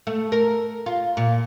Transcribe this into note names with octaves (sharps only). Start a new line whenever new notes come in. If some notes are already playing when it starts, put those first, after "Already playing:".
A3
A#4
F4
A#2